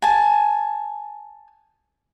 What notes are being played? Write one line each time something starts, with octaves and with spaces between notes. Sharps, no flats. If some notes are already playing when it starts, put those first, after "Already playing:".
G#5 A5